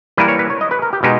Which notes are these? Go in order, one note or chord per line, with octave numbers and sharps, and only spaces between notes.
E3 G3 A#3 E4 B4
C#5
B4
C#5
D#5
B4
A#4
G4
B2 G#3 D#4 G4